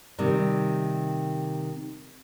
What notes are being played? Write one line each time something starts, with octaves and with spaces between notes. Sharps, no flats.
C3 D#3 G3